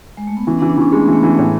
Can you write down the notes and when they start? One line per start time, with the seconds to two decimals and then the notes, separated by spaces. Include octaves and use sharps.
0.17 G#3
0.27 A3
0.37 B3
0.47 E3 C#4
0.59 D4
0.62 E3
0.70 D4
0.77 E3 C#4
0.92 G#3 A3
1.03 B3
1.08 E3
1.13 A3
1.22 E3 B3
1.34 A2 A3